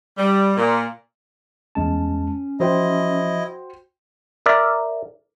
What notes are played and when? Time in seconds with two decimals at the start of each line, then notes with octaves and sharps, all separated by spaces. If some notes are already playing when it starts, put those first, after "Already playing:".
0.18 G3
0.57 A#2
1.75 E2 G#3 C#4 A5
2.60 F3 E4 F#4 C5 D#5 G5
4.46 A#4 D5 E5